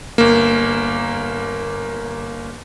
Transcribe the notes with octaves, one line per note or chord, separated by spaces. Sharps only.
G1 A#3